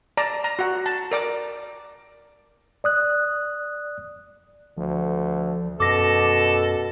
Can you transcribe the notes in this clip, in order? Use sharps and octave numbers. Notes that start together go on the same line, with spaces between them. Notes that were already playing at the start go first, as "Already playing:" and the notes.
D5 A5 A#5
A#5
F#4 F#5
A5
A#4 D5 D6
D5 D#6 F#6
D2 F3
F#2 B2 A4 D6 A#6